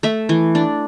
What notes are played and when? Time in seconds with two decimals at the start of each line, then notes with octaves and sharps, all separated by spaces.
0.03 A3 E5
0.29 E3
0.55 D4